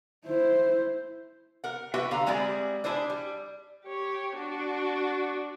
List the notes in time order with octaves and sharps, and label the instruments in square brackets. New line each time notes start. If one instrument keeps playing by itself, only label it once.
[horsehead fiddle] E4 C5
[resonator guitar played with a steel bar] A#4 F#5
F#4 G4 B4 E5 G5
D3 F5 A#5
G3 G#3 C4 E4 G#4 D5
D4 E4 G#4 C5 D5
G3
[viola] G4 C#5
D4 F#4